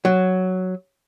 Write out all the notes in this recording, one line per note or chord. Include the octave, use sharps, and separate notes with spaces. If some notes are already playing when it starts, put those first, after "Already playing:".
F#3